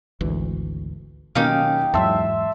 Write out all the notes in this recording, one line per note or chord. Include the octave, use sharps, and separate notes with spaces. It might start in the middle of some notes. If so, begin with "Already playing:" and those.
G#1 D2 E3
B2 D#3 F#3 A#3 C#4 D#4 G4 F5
E2 G#2 F#3 E5 A5 C6 E6